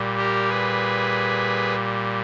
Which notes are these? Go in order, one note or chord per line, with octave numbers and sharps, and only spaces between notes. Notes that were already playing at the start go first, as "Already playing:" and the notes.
Already playing: A#2 G3
G4 A#4
G#4 B4